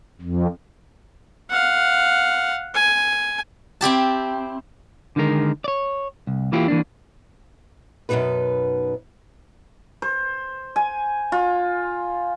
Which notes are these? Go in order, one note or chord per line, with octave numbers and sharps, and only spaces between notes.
F2
F5 F#5
G#5
C4 E4 G4 A5
D3 D#3 G#3 A#4
C#5 D5
C2
E3 A#3 E4 F4 G4
E3 A#3 D4
F#2 B2 D#3 E3 D#4 B4
C5
G#5
F4